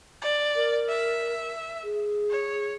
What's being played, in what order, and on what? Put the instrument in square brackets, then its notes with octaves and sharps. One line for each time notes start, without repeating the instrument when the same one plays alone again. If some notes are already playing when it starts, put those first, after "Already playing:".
[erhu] D5
[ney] A#4
[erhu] E5
[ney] G#4
[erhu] C#5